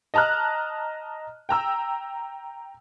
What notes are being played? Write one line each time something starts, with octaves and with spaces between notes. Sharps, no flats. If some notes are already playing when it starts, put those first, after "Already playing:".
D#5 A5 A#5 F6 F#6
G5 A#5 E6